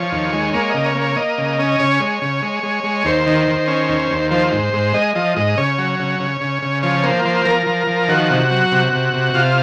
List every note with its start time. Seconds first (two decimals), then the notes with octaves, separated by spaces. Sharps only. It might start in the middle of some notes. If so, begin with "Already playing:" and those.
Already playing: F3 C#5
0.12 D#2
0.33 G#3
0.54 A#3 C#5
0.70 C#3 D#5
0.86 C#5
0.95 A#3
1.01 C#5
1.16 A#3 D#5
1.38 C#3
1.59 C#4
1.79 C#3 C#5
2.00 G#3
2.22 C#3
2.42 G#3
2.63 G#3
2.84 G#3
3.05 D#2 C5
3.27 D#3
3.48 D#3
3.68 C#4
3.89 D#2
4.10 D#2
4.31 F3 C5
4.52 G#2
4.74 G#2
4.94 G#3 D#5
5.15 F3 D#5
5.36 G#2 D#5
5.58 C#3 C#5
5.78 F#3
5.99 C#3
6.20 C#3
6.41 C#3
6.62 C#3
6.83 F3 C#5
7.03 A#3 C5
7.25 F3 C5
7.45 F3 A#4
7.67 F3
7.87 F3
8.08 D#3 F#4
8.30 C3
8.51 F#3
8.72 C3
8.93 C3
9.14 C3
9.34 C3 F4